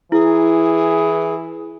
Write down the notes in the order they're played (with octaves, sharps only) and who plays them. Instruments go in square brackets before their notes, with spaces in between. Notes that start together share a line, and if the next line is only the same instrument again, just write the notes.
[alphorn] E3 [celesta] E4 [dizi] G#4